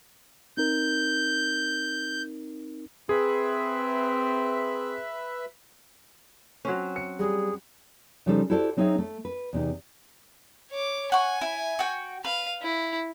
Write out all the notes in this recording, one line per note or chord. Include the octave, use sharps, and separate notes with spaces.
C4 D#4 A#4 G6
C4 G#4 B4 E5 B5
F#3 C4 C#4
C#7
G3 G#4
C#3 F3 G3 D#4 A4 C5
E4 F#4 G4 A4 C5 D5
F#3 C4 D#4 G#4 C#5 E5
A3
B4
E2 C3 D#4
C#5 D6
F#5 G#5 C#6
E4
F#4 G5
B4 F5
E4